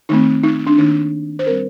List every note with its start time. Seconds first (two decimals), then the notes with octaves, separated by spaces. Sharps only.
0.09 D#3 A3 C4 D#4
0.44 D#4
0.67 D4
0.78 D#3 A#3 D4 D#4
1.39 C5
1.46 G3 C4 A#4